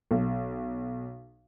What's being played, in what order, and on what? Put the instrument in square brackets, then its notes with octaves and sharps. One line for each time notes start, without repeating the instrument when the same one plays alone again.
[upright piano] B1